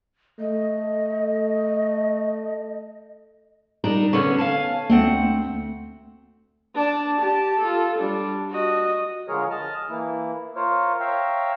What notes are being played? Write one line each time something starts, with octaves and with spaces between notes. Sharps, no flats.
A3 D#5
G3 D4 D#4 A#4
D3 B3 C#4 C#6 G#6
F5 G#5 A5
D2 A3 C4 F#5
D4 A5
G4 A5
F4 A4
G3 D4
F#4 D#5
D3 F3 G#3 G#4 A#4 C#5
D#5 A5 F6
E3 A#3 E4
F4 A#4 C5 C#5
C#5 E5 F5 G5 A#5